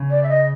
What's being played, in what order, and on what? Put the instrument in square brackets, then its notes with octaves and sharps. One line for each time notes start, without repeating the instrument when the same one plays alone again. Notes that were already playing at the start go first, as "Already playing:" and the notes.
Already playing: [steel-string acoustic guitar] C#3
[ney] D5
E5
D#5